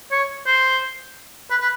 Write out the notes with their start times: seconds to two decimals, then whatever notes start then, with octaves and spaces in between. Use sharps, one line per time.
0.11 C#5
0.46 C5
1.50 B4
1.61 B4